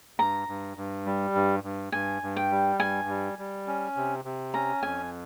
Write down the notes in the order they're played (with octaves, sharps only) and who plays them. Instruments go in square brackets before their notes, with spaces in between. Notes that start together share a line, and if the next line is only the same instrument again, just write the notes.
[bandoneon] G2 [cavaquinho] A#5
[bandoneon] G2
G2
G3
G2
G2
[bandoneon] G2 [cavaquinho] G#5
[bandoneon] G2
[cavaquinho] G5
[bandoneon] G3
[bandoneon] G2 [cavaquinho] G#5
[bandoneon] G3
G3
C#4
C3
C3
[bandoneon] C#4 [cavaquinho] A#5
[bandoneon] F2 [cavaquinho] G#5